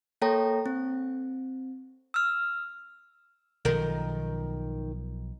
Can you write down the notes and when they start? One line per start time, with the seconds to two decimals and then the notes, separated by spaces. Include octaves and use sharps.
0.22 A#3 A4 C#5 G5 A#5 A#6
0.66 C4
2.14 E6 F6
3.65 B1 D#3 F3 A#4